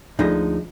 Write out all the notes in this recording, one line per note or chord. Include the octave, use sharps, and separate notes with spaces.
D2 D3 F3 G#3 D#4